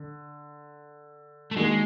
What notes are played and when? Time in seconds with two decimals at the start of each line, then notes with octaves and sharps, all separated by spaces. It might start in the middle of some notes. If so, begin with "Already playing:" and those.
Already playing: D3
1.51 A3
1.56 D#3 G3 G#3 A#3 D4 F#4